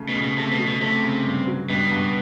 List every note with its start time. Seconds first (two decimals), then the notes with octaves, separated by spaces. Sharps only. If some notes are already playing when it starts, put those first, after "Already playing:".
Already playing: C#3 F#3 A3
0.09 B2
0.15 C#3
0.23 B2
0.37 C3 A3
0.52 B2
0.59 F#3
0.67 B2
0.81 C3 A3
1.03 C#3
1.25 G2
1.47 F#3
1.69 G2 B2
1.91 G2